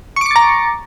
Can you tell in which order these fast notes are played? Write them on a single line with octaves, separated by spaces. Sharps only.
C#6 D6 C#7 A6 A#5